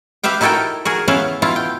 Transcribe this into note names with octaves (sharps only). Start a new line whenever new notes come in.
G4 B4 E5 F5 G5
D#4 E4 F#4 A4 A#4 G5
F#4 G#4 A#4
B3 C#4 E4 B4 F5
B2 E4 F4 F5
G5